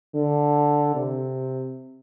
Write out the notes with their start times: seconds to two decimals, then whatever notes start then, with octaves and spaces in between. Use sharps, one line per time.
0.15 D3
0.96 C3